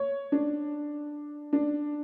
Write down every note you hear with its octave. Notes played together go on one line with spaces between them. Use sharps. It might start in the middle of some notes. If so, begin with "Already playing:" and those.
Already playing: C#5
D4
D4